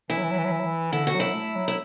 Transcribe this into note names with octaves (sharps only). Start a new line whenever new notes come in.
E3 E4
F#3
E3
F#3
E3
F#3
E3
F#3
E3
D3 E4
F#4
F#3
E4
A3
F#3
E4